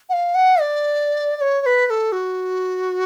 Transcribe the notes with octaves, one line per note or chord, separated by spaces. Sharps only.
F#5
F5
F#5
D5
D5
C#5
C#5
B4
B4
A4
F#4